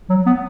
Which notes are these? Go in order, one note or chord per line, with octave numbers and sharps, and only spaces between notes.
F#3
B3